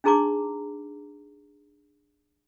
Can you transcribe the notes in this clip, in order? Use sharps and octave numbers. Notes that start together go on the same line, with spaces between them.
D4 D#4 G#4 A#5 C6 D6